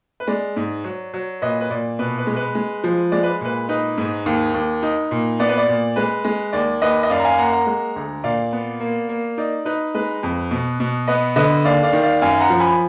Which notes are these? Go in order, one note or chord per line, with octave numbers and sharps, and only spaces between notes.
B4
G#3 D5
G#2
F#3
F#3
A#2 B4 D#5
B4
A#2 D5
B2 B4
B4
G#3
B4
G#3
F3
G#3 D5
B4
A#2 B4
D#4 B4
G#2
D#2
D#2
D#4
A#2
B3 D5
B4
D5
A#2
G#3 B4
G#3
D#2 D5
D#2 B4 D#5
D#5
F#2 D5 F5
A#5
F5 G#5
A#3 F#5 A#5
F#5 A#5
G#3
D2
A#2 D5 F5
B3
A#3
A#3
D#4 D5
D#4 B4
G#3 B4
F2
B2
B2
B3 B4 D#5
D3 B4 D#5
D#2 D5 F5
D5 F5
D#3
D5 F5
F#2 F5 G#5
F#5 A#5
F3
G#5 B5